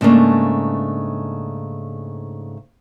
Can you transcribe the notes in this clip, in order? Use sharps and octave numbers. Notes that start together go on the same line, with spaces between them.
G#2 C#3 A3 A#3 D4